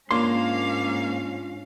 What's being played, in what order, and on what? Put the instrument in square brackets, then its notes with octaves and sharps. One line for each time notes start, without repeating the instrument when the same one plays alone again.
[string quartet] G#2 C#4 F5 [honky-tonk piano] A#3 [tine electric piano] D4 F4 C#5 [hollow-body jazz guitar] C6